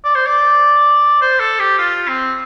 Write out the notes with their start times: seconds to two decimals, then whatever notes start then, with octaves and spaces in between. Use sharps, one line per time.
0.04 D5
0.15 C5
0.26 D5
1.21 C5
1.40 A4
1.59 G4
1.78 F4
2.08 C4